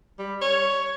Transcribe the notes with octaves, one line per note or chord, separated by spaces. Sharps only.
G3
C#5